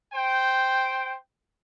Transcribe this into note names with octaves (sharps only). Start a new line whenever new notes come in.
C5 G5